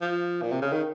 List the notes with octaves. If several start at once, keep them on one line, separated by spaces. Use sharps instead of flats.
F3
A#2
C3
C#3
D#3